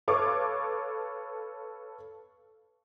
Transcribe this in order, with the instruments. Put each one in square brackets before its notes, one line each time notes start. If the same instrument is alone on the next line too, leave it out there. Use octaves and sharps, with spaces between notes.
[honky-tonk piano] A4 B4 C#5 F5 C#6 D6